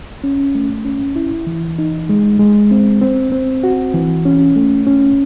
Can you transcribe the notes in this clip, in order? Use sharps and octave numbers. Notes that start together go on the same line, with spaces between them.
C#4
A3
C#4
E4
E3
D#4
G#3
G#3
C4
C4
C4
F#4
E3
C#4
A3
C#4